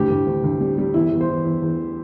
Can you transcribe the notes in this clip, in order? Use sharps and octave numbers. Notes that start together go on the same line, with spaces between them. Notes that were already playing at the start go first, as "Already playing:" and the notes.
Already playing: D2 A2 G4
D2
D2
D2
G3
G3
E2 E4
E2
C5
E2
E2
E2